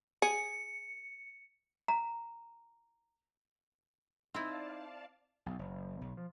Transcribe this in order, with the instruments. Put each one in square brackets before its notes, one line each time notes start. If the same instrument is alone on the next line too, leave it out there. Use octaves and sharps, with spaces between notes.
[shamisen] G#4 [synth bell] C#7
[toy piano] A#5
[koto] C4 E4 [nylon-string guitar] D#4 [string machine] D5 F5 A5
[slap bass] B1
F#1
B1
F3